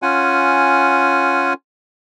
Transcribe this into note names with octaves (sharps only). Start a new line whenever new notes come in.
C#4 F4 F#5 G#5